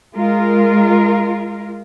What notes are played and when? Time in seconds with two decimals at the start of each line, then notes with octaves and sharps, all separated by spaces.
0.15 G#3 F4 A#4